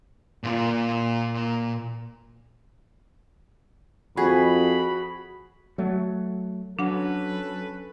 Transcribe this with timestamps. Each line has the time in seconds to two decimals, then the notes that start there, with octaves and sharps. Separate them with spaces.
0.44 A#2 F4
4.17 F2 F#4 G#4 B5
5.78 F#3 A3
6.79 F#3 C#4 D4 A4 B4 F#5